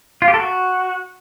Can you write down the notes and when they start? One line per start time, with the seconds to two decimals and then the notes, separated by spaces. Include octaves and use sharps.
0.22 F4
0.28 G4
0.34 A4
0.40 F#4